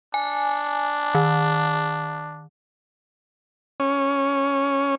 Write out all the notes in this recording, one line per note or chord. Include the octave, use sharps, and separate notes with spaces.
D4 G#5
D#3
C#4